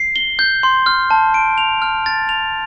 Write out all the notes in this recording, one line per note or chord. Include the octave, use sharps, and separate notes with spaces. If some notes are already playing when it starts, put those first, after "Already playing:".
Already playing: C7
G7
G6
C6
F6
A5
D7
F7
F6
A6
F7